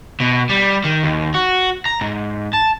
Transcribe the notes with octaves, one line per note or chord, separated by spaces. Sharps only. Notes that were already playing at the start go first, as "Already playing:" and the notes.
B2
G3
D#3
D#2
F#4
A#5
G#2
A5